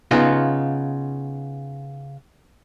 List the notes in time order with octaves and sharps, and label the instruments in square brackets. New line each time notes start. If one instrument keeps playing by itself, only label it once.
[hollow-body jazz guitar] C#3 B3 D#4 F4